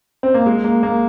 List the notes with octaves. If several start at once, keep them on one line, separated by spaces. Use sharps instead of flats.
C4
A#3
G#3
A#3
A#3